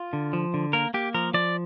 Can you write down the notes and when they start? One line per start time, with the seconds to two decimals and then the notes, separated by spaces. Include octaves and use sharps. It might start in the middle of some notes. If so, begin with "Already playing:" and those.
Already playing: F4
0.13 D3
0.33 F3
0.54 D3
0.73 A#3 A#4
0.94 A#3 G4
1.14 F3 A#4
1.34 F3 D5